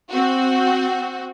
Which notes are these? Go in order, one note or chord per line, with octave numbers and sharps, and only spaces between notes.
C4 F#4